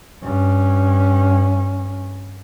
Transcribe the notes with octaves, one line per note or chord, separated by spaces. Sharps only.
G2 C#4